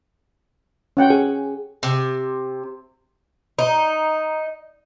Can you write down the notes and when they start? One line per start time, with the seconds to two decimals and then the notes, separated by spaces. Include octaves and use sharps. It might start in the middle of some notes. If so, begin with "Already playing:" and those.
0.97 C#4 F#5 G5
1.10 G#4
1.83 C3
3.59 D#4